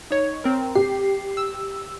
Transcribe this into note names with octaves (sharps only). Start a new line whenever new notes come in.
D#4 C#5
C4 A#4
G4 C7
E6